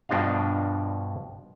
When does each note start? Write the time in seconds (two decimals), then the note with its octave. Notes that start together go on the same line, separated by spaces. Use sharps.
0.09 G2 B2 F3 D4 D#5 F5